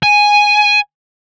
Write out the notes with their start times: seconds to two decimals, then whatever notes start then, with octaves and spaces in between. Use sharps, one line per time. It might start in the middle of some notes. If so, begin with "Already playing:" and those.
0.03 G#5